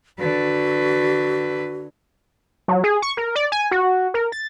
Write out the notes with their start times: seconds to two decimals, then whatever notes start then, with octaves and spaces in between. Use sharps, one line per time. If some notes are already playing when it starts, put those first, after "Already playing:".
0.19 D3 F#4 B4
2.68 F#3
2.84 G#4
3.02 C#6
3.17 A#4
3.36 D5
3.52 G#5
3.71 F#4
4.14 A#4
4.32 A6